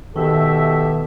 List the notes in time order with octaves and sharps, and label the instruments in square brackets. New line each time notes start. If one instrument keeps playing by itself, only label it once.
[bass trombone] B2 [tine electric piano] D#3 [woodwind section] G4 E5 [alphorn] A4